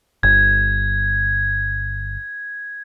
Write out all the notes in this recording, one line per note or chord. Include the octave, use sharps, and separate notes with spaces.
G1 G#6